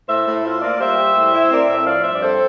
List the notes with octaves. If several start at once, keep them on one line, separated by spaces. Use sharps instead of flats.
A2 C5 E5
A2
F4 C5 E5
A#3 D5 F5
G3 C5 E5
G3
A2
E4
C4 A#4 D5
A2 C5 E5
F3 D5 F5
G2 C5 E5
D5
C4 A4 C5